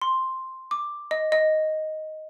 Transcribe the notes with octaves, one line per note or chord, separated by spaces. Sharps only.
C6
D6
D#5
D#5